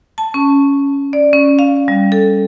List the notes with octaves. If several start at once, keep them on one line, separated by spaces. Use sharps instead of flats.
A5
C#4
D5
C#4
F5
G3
A4